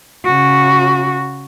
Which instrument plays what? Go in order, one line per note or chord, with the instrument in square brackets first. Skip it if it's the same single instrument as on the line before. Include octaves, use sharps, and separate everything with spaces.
[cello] C#3 F#4